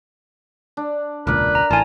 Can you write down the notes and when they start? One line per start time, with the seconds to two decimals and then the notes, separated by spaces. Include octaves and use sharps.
0.77 D4
1.27 E1 C#2 A#2 A#4 B4 D5
1.55 A#5
1.71 A1 A2 F4 G#5 A5